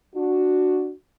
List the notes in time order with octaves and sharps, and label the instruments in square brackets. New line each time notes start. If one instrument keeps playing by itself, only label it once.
[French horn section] D4 F#4